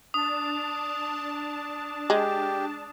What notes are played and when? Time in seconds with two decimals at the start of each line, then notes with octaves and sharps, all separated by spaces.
0.14 D4 A5 D#6
2.10 G#3 G4